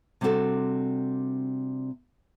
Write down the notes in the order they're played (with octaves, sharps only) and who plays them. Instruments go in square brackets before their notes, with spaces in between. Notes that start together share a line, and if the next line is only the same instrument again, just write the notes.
[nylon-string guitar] C3 G3 C4 D4 F#4 A4